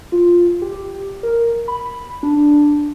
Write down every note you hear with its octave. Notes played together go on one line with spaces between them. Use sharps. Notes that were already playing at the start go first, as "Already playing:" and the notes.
F4
G4
A#4
B5
D4